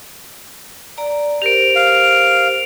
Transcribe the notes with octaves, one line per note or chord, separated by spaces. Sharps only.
D5 A#5
G4 A#4 C5 D7 F7
F5